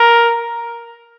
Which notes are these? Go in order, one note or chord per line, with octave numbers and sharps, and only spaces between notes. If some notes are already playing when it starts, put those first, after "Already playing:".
Already playing: A#4